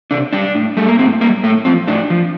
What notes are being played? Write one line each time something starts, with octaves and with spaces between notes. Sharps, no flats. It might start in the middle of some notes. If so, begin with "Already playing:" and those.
C3 D4
G3 D4
A2
G3 A3
A#3
A2 C4
G3 A#3
A2 A3
F3 C4
A2 D4
F3